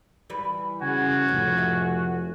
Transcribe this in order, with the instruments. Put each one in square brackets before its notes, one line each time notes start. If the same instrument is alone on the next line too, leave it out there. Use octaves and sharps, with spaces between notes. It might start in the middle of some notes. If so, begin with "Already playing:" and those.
[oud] E3 G3 B4
[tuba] C#3 [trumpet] F#4 [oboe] G#5
[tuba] F1 [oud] A2
[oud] E5